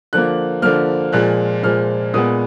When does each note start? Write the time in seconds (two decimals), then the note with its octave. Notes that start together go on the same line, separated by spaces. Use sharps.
0.13 D3 F3 A#3 F#6
0.62 D3 F3 A#3 F6
1.13 A#2 F3 G#3 F#6
1.63 A#2 F3 G#3 F6
2.14 A#2 G#3 B3 D#6